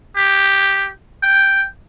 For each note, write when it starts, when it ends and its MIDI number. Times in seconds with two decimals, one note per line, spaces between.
0.16 0.90 67
1.23 1.65 79